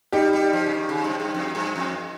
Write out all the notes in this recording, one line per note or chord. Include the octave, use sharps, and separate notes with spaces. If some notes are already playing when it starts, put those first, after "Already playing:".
G3 D#4 G4
G3
F3
C#3
D#3
C#3
G2
G2
F2
G2
F2